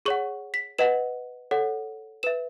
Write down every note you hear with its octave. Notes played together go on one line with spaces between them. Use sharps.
G#4 C#5 F#5 C#6
B6
B4 D#5 F#5 E7
A4 C#5 F#5
B4 E5 E7